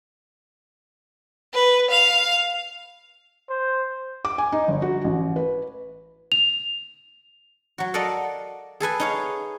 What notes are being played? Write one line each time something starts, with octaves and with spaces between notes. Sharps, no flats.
B4
F5
C5
D6
G#5
D#4
G1
F#4
A1
B4
F7
F#3 F#4
A4 A#4 D5 D#5 F5 F#5
G#4 A4 B4 G#5
D#4 C#5 F5